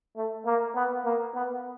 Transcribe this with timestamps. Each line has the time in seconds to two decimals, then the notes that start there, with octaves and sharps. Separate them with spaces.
0.17 A3
0.46 A#3
0.75 B3
1.05 A#3
1.35 B3